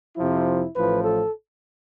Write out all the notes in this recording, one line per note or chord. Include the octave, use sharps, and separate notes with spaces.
F2 C3 F3 E4
A1 A2 F3 B4
A4